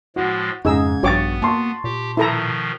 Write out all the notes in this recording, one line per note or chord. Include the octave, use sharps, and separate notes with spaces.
A2 F3 G#3 F#4
F2 G#2 C#3 D#4 G#4 E6 G#6
A#1 G2 B3 F#4 C#5 G5 D6 A6
A#3 A5 C6 C#6
A#2 G4
B2 D#3 F3 E4 A4 A#5